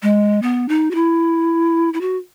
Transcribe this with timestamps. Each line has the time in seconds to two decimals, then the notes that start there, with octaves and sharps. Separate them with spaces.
0.03 G#3
0.42 B3
0.69 D#4
0.91 F#4
0.95 E4
1.94 E4
2.01 F#4